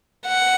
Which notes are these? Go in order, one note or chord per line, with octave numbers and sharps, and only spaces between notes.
F#5